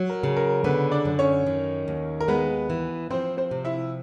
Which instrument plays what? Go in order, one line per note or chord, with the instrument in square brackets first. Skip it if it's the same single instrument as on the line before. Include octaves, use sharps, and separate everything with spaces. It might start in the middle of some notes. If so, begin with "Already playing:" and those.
Already playing: [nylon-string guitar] F#3
[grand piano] A#4
[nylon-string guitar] C#3
[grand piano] A#4
[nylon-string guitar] D3 [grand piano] B3 B4
[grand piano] D4 D5
[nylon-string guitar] F#2
[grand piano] C#4 C#5
[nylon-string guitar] D#3
D#2
[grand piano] A#4
[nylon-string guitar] G#3 [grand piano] B3 B4
[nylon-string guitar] E3
[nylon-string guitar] F3 [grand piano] C4 C5
[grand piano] C4 C5
[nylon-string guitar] C3
[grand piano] E4 E5